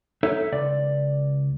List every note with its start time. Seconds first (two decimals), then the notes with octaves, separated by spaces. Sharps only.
0.23 D#4 A4 C#5 E5
0.52 C#2 D5